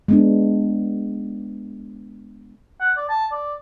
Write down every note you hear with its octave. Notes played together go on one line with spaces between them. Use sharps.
G#3 B3 D4
F#5
D5
A5
D5